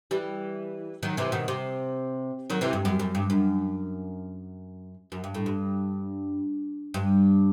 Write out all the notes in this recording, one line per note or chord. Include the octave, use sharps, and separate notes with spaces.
E3 G3
D#3 F#3
C3 E3
B2 D#3
C3
D#3 F#3
C3 E3
G2
F#2
F#2
G2
F#2
F#2
G2
A2
G2
G2